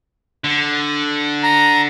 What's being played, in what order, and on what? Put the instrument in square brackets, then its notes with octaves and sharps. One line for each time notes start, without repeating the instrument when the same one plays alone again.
[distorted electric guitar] D3
[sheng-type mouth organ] A#5